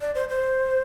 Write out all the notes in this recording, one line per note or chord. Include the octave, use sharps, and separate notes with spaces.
D5
C5
C5